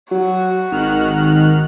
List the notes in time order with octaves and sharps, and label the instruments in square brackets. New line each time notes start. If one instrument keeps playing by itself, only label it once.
[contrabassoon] F#3 [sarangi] F#4
[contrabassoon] G#1 [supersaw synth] D#3 F6 F#6